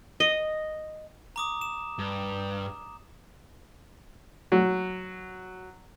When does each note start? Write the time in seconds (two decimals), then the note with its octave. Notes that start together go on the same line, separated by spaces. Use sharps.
0.20 D#5
1.36 A#5 D6 D#6
1.61 E7
1.98 G2
4.52 F#3